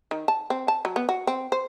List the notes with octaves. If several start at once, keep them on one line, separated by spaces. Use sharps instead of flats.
D#3
A5
C4
A5
F#3
B3
F#4
C4
C5